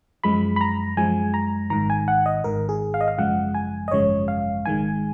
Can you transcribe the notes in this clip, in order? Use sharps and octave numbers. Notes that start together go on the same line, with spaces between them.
F#2 F3 G#3 B5
B5
A#5
F#2 F3 G#3 G#5
A#5
G#1 G#2 D#3 A#5
G#5
F#5
D#5
G#1 G#2 D#3 A#4
G#4
F5
D#5
F5
G#1 F#2 C#3 F3 G#3 F#5
G#5
D#5
G#1 F#2 C#3 F3 G#3 C#5
F5
G#1 G#2 D#3 G#3 G#5